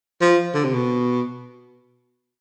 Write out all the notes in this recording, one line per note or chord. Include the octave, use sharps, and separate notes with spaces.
F3
D3
C3
B2